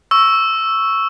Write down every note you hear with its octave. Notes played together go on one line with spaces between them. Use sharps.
C#6 E6